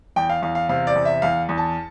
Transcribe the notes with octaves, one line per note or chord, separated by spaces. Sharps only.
E2 G5
F5
E2 F5
F5
C3 F5
D5
E2
E5
E2 F5
E2
A5